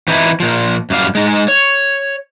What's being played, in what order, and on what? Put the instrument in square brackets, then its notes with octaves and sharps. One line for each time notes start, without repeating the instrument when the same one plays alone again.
[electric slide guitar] E3 C4 D#4 E4
A#2 F3
F#2 G3 F5
G#3 D#4
C#5